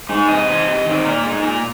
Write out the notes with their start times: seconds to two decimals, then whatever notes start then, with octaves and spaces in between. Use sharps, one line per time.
0.09 G#3 D#4
0.28 C3 D#5
0.47 D#3 C4
0.66 C3
0.85 D#3 C4
1.05 A#2 A#4
1.24 G#3 D#4
1.43 A#2 A#4